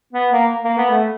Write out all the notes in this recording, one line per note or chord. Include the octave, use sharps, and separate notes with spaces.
B3
A#3
A#3
B3
A3